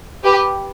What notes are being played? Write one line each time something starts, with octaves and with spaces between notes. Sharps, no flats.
G4 B4